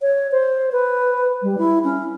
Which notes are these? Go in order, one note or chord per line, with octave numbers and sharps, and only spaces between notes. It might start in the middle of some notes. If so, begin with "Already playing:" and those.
C#5
C5
B4
G3
E4
C#4